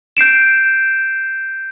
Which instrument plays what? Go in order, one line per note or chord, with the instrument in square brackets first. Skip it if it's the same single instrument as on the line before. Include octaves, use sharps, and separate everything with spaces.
[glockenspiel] G6 C7 D7 E7